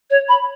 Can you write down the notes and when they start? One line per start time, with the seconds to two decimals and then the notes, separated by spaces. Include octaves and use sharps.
0.10 C#5
0.29 B5